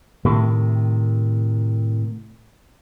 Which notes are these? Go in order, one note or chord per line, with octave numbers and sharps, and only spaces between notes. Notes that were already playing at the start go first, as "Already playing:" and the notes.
A2 C3 D#3